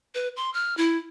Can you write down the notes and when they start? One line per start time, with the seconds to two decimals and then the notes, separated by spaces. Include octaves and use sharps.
0.15 B4
0.36 C6
0.54 F6
0.77 E4